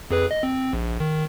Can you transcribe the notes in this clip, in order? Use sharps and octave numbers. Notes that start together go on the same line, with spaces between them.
F2 G#4 B4
D#5
C4
A#1
D#3